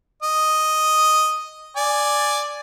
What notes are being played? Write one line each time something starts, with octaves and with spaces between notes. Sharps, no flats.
D#5
D5 G#5